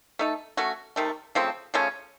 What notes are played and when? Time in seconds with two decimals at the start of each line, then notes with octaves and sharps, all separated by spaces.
0.19 A3 D#4 A4
0.57 A3 C#4 F#4
0.96 C3 D#3 A3
1.35 C#3 F3 A3 C4
1.74 C#3 F3 A3 C#4